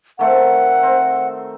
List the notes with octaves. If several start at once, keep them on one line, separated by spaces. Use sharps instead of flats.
D#3 A3 C4 F#5
C4